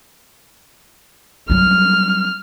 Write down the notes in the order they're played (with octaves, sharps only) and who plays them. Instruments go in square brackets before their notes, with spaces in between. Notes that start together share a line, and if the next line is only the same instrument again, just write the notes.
[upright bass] F#3 G3 [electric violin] F6